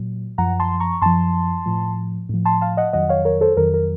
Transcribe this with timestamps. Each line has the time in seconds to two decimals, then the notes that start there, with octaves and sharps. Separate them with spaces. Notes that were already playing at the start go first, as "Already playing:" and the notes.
Already playing: A#2 F#3
0.38 F#2 F3 F#5 A#5
0.60 A5 C6
0.80 A#5 C#6
1.01 F#2 F3 A5 C6
1.66 A2 F3
2.29 A2 F3
2.45 A5 C6
2.61 F5 A5
2.77 D#5 F#5
2.93 F2 D#3 F#3 D#5 F#5
3.09 C#5 F5
3.25 A#4 C#5
3.41 A4 C5
3.57 F2 D#3 F#3 A#4
3.74 A#4